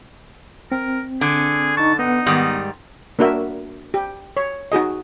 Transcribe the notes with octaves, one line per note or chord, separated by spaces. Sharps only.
C4 A#4
D3 G#4
D#4 A5 C#6
B3 D#4 F#5
G#2 D#3 G3
A#3 D4 F#4 A#4 E5
G4
C#5
D#4 F#4 G#4 D#5